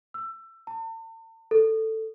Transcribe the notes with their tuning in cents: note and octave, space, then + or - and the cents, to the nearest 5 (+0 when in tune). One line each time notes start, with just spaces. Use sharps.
E6 +20
A5 +45
A4 +10